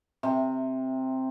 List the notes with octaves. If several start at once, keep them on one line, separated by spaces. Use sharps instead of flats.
C3